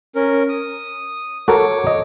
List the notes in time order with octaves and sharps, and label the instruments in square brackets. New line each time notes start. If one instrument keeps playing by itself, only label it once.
[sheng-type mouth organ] C#4 A#4
D#6
[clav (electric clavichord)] F#4 A4 A#4 [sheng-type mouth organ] C#5 D6
[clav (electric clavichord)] D#5